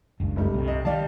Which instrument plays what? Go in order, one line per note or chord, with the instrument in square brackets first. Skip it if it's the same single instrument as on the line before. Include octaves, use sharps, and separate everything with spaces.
[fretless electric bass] F#1 C#2 G2
[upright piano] F1 G3 A3
[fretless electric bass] C2 C3
[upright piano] D#5
[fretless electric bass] D#3 G3 [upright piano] D5 F5 A5